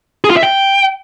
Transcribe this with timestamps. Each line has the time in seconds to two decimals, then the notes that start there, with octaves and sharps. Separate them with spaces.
0.24 G#4
0.30 F4
0.36 E5
0.43 G5